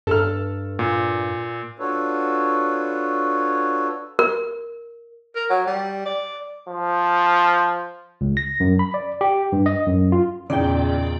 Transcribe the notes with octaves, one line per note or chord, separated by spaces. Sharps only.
G2 A4 F6
A#2
D4 F4 F#4 A4 B4 C#5
A#4
A#4
F#3
G3
D5
F3
C#2
A#6
F#2
B5
D5
G4
G2
D#5
F#2
F4
E2 A#2 C#3 D#4 D5 G5